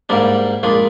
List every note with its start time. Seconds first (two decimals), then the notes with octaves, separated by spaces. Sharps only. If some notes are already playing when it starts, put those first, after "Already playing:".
0.09 G#2 G3 A#3 D4
0.63 A#1 A#2 G#3 D4